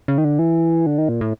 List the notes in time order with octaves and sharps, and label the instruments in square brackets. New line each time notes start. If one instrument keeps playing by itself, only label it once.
[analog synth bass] C#3
D#3
D3
E3
D3
D#3
A#2
A2